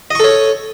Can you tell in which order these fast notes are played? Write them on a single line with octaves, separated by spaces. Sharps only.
D#5 C#6 A4 C#5